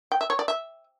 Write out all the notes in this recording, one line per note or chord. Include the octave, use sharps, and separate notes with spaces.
G5
E5
C#5
D5
E5